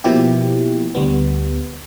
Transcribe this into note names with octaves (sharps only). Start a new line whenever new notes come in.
B2 F3 A#3 E4 G4
D2 G3 B3